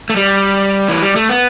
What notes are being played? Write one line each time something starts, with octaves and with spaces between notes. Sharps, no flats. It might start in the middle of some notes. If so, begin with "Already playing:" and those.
A3
G3
E3
G3
A3
B3